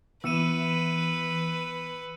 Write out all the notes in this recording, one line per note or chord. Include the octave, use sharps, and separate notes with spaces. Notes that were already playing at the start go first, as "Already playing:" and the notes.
E3 B3 B4 E6 C#7 D#7 E7